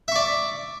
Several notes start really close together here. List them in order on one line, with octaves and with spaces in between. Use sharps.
E5 C#6 D5